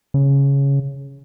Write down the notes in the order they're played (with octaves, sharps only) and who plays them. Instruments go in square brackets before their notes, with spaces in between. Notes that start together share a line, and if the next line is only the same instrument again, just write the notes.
[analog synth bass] C#3